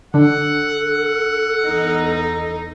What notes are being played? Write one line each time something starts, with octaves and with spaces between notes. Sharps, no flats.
D3 D4 A4 F#5
E2 D#4